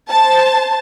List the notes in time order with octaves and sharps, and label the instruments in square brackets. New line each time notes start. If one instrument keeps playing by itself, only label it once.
[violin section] C5 A5